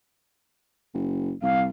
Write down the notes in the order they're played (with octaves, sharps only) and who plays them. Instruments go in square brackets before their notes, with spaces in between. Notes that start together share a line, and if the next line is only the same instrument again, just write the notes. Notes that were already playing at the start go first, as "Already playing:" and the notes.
[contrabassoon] F#1
[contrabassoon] C2 [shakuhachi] F5